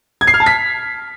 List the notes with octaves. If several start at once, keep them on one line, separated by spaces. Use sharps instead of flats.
G#6
C7
F6
A5
B6